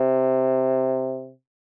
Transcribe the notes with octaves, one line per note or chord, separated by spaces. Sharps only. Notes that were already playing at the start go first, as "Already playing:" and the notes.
Already playing: C3